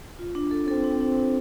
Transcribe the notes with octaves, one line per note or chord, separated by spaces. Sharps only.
F4
D4
A4
C4 A4
D4
D4
D4